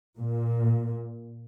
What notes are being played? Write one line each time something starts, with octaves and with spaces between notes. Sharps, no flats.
A#2